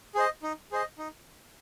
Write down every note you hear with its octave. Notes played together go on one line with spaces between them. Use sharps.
G#4 C5 D#5
D#4
G#4 C5 D#5
D#4